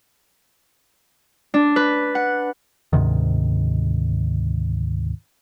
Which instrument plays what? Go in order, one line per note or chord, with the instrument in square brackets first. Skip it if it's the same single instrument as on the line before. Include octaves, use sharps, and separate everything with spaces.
[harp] D4
B4
F#5
[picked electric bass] D2 G#2 C3 D#3